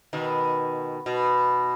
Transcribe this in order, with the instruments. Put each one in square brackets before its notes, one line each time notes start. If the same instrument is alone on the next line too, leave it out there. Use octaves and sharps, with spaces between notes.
[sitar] B2 D#3
B2